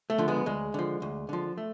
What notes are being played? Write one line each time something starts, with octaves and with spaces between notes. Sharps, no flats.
A3
D3 F3
G#3 B3
D2 G#3
D3 F3
D2
D3 F3
A3